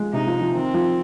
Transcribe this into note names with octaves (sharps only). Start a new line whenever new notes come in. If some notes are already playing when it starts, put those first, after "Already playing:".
Already playing: F3 G#3
C3 D#4
F3
F3
D#3 C4
F3